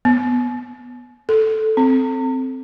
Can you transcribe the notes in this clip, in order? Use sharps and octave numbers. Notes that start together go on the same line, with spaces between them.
B3
A4
C4